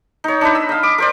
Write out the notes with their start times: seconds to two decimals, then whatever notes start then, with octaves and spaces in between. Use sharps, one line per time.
0.24 D#4 C#5
0.41 D4 D#4 B4
0.55 E6
0.69 D#5 F5
0.83 D6
0.98 A#4 C5 D5